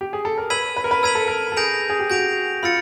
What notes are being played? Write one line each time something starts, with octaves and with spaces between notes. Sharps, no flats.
G4
G#4
A4
A#4
B4 E6 G#6 B6 D#7 F#7
B4
A#4
B4
A#4 E6 G#6 B6 D#7 F#7
A4
A#4
A4
G#4 G6 A#6 D7 F7
G#4
G4
F#4 G6 A#6 D7 F7
F4 B5 E6 A6 C#7